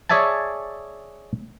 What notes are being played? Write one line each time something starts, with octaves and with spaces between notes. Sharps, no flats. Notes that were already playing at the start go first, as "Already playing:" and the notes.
G#4 C#5 D5 E5 G#5 A5